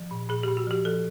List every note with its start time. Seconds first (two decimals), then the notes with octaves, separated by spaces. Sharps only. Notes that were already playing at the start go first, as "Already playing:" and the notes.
Already playing: F3
0.11 A#2
0.29 A#2 G#4
0.43 G4
0.48 A#2
0.57 F#4
0.67 F3 G4
0.85 F3 A4